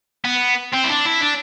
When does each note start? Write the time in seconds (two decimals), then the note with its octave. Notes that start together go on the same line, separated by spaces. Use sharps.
0.25 B3
0.73 C4
0.84 E4
0.89 D4
1.05 E4
1.21 D4